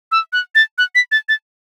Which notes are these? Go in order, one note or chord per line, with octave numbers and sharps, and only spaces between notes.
E6
F#6
A6
F#6
B6
A6
A6